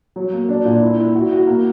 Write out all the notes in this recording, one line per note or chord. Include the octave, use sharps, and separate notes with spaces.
F#3
A#3
D4
A#2
E4
E4
F#4
F#4
A#3